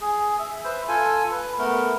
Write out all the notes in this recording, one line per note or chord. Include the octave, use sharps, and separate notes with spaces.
G#4
E5
B4 C5 E5
F4 A4 G#5
B4
A3 B3 A#4